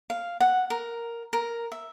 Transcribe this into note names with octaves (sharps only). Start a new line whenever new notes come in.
F5
F#5
A#4
A#4
E5